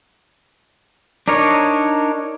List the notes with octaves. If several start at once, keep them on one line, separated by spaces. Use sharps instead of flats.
D4 D#4 A#4 C#5